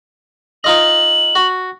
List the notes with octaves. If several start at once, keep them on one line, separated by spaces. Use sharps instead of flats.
D#4 F4 D#5 F#7
F#4